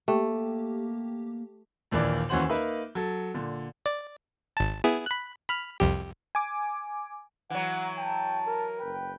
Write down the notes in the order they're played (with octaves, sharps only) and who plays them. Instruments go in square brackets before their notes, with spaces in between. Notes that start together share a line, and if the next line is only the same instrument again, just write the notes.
[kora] A3 [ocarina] A#3 [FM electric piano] G4
[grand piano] A#1 D#2 E3 A#3 D4 D5
D#2 E3 C#4 F#4 C5 F#7
A#3 D#4 B4 E5
F#3 A4
A#2 D3
[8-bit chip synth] D5
G#1 A5
B3 E4 G#4
B5 F#6
B5 F6
C2 F2 G4
[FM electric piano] G#5 D6
[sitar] E3 F#3 [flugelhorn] F#5
[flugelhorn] G5 [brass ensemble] A5
[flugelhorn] A#4
[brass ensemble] F#1 B4 G5